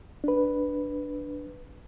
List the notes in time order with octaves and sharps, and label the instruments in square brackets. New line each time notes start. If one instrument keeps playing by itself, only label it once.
[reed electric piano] D4 B4